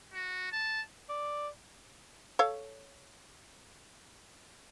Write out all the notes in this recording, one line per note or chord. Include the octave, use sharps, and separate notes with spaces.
F#4
A5
D5
A4 C#5 F5